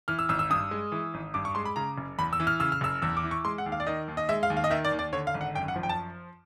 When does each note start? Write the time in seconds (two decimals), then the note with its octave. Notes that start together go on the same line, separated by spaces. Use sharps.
0.08 E3 F6
0.19 E6
0.29 G#1 E6
0.39 E6
0.50 G2 D#6
0.71 G#3
0.92 E3
1.14 G#1
1.34 G2 D6
1.45 C#6
1.55 G#3 C6
1.65 B5
1.76 C#3 A#5
1.98 F#1
2.19 E2 B5
2.33 E6
2.40 E3
2.47 F6
2.60 C#3 E6
2.72 F6
2.81 F#1 E6
3.02 E2 E6
3.17 D6
3.23 E3
3.31 C#6
3.45 G#3 C6
3.58 F#5
3.66 D#2
3.72 F5
3.80 D5
3.87 D#3 D#5
4.08 D#2
4.17 D#5
4.29 G#3 E5
4.43 F5
4.50 D#2
4.57 F5
4.64 D#5
4.70 D#3 E5
4.85 D5
4.92 D#2
4.99 D5
5.13 D3 C#5
5.27 F5
5.34 G#1
5.41 F#5
5.55 F#2 G5
5.68 F#5
5.76 F3
5.83 G5
5.89 A5